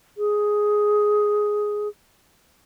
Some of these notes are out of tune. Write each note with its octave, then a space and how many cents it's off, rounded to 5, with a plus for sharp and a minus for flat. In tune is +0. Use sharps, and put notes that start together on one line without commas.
G#4 +5